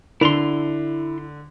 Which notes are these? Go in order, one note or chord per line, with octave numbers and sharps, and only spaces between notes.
D3 E4 C6 F7